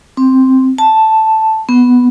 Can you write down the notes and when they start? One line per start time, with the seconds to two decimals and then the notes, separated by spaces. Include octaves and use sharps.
0.17 C4
0.78 A5
1.69 B3